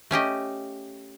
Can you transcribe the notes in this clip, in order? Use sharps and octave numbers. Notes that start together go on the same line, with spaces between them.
A3 C#4 G4 D#5